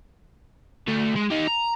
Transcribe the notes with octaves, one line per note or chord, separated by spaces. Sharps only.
D2 A3
G#3
D#4 G4
A#5